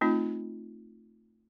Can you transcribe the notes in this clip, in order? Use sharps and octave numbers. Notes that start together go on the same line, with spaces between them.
A3 C4 D#4 F4